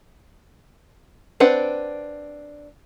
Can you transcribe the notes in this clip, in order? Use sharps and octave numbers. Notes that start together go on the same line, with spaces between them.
C4 D4 B4 F#5